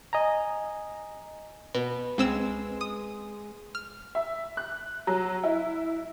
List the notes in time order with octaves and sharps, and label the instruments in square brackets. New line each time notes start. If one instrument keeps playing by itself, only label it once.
[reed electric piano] D#5 G#5 A#5
[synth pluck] B2 [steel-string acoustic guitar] B4
[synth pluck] C#2 C4 E6 [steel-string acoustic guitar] G#3
[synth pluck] D#6
F6
[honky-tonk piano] E5
F#6
F#3
E4